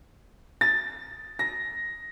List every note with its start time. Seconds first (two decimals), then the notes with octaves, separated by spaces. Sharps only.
0.61 A6
1.39 A#6